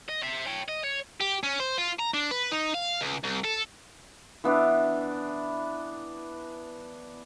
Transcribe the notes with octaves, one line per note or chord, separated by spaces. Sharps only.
D#5
C5 E5
C#5 G5
D#5
C#5
G4
C#4
C5
F4
A#5
D4
B4
D#4
F5
C#2
C2
A4
E3 B3 D4